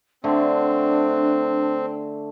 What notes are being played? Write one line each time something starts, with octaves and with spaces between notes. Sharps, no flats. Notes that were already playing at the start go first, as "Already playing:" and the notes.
D3 A3 C4 D4